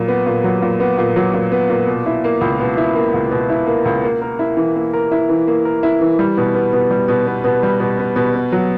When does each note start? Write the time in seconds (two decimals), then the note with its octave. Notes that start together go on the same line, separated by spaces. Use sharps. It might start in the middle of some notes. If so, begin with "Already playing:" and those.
Already playing: A#2 F#3
0.08 B3
0.26 A#2
0.44 F#3
0.62 A#2
0.80 B3
0.98 A#2
1.16 F#3
1.34 A#2
1.52 B3
1.69 A#2
1.87 B2
2.06 E4
2.24 A#3
2.41 C#2
2.60 B2
2.78 E4
2.95 A#3
3.14 C#2
3.31 B2
3.50 E4
3.67 A#3
3.85 C#2
4.04 A#3
4.22 A#4
4.39 E4
4.57 E3
4.76 A#3
4.94 A#4
5.11 E4
5.29 E3
5.47 A#3
5.65 A#4
5.83 E4
6.01 E3
6.19 G3
6.38 B2
6.55 B3
6.73 B2
6.91 G3
7.08 B2
7.27 B3
7.44 B2
7.63 G3
7.80 B2
7.99 B3
8.16 B2
8.35 B3
8.52 F#3